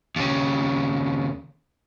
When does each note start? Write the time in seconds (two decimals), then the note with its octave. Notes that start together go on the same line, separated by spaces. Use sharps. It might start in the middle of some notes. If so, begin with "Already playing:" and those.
0.16 D#2 C#3